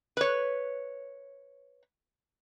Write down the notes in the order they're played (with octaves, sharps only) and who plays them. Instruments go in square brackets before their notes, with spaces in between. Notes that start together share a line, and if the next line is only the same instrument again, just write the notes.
[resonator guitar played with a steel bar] B4 C#5